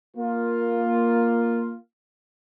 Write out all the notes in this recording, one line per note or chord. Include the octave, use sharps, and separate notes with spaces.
A#3 F4